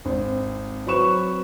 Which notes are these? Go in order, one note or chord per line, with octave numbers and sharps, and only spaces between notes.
G#1 C4
F#3 C4 B4 C#6 E7